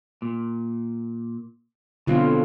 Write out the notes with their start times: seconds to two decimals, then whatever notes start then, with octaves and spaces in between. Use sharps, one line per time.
0.22 A#2
2.07 B2 D3 F#3 C4 F4